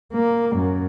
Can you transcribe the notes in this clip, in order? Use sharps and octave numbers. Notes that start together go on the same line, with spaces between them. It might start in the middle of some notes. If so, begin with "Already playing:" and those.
A#3
F#2